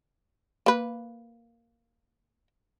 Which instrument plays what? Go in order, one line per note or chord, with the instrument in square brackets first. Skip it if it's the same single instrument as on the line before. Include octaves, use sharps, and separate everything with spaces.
[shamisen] A#3 B4